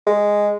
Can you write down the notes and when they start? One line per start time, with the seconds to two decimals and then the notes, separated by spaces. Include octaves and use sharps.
0.06 G#3